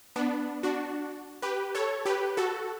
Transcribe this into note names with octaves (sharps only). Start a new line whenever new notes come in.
B3 D4
D4 F#4
G4 B4
A4 C#5
G4 B4
F#4 A4